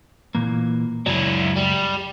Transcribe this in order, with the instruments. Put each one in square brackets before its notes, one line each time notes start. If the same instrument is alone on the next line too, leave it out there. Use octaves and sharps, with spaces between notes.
[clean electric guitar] A#2 E3 A#3
[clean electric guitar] C#2 F#2 D5 [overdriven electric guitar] F#3 E4
[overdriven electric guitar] G3